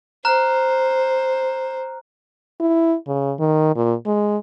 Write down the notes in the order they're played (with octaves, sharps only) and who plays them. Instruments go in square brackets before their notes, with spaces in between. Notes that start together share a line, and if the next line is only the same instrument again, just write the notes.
[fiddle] C5 [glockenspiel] A#5 F6 F#6
[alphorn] E4
C#3
D#3
A#2
G#3